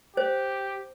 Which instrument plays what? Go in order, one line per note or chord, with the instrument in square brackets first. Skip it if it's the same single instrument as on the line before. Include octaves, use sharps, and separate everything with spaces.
[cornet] G4 [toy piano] C5